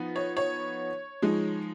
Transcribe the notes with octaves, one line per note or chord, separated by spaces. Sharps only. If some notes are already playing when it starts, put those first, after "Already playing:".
Already playing: F3 B3 D#4
C#5
C#5
F3 G#3 D#4